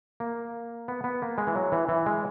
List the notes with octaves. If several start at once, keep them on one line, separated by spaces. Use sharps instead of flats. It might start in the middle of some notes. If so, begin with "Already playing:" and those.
A#3
B3
B3
A#3
G#3
E3
F#3
E3
E3
G#3